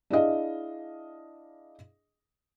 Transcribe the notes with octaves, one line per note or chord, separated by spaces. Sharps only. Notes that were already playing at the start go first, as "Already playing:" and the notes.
D4 E4 G#4 D#5 F5